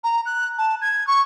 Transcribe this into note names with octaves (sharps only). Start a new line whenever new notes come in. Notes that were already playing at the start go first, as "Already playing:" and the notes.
A#5
F#6
A5
G#6
C#6